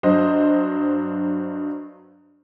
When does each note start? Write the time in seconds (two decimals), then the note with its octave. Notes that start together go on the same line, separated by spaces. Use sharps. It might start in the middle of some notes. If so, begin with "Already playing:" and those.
0.03 G2 F#3 C5 D#5